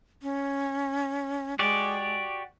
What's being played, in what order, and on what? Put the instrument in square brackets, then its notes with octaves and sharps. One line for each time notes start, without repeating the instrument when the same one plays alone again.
[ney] C#4
[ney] G#3 [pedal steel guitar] F#4 G4 D5